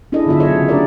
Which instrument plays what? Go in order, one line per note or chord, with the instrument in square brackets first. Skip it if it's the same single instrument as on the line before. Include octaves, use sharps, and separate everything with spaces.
[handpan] D4 E4 G#4 A4 D#5
D3 F#3 B3 F4 E5
F#3 G#4 A4 C#5 D#5 E5
C#3
A3 D4 G4 G#4 A#4 D5